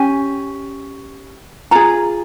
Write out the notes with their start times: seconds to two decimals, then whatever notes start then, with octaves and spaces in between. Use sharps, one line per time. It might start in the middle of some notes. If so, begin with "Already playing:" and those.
Already playing: C#4 G4 G#5
1.71 F4 G#4 A#5